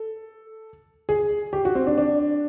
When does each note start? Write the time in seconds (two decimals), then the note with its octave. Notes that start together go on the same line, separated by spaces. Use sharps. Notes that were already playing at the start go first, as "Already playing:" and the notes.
Already playing: A4
1.09 G#4
1.53 G4
1.65 F#4
1.75 C4
1.87 D4
1.98 D4